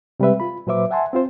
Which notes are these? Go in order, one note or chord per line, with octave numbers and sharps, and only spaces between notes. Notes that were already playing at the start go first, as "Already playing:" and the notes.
C3 G3 G#3 B4 E5
F4 B5
A#2 F#3 B4 C5 E5 D6
E5 F#5 G#5 A5 C6
C4 F4 C5